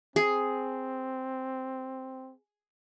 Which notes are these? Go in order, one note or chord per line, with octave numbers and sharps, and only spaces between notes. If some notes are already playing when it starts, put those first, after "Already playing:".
C4 G#4